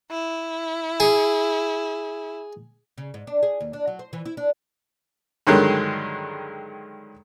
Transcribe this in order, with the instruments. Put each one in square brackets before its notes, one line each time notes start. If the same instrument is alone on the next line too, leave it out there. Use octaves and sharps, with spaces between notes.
[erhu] E4
[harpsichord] G#4
[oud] C#3
G#2
D4
G#4
D#2
D4
F#3
C5
E3
E4
D4
[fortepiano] G2 D3 D#3 F#3 G#3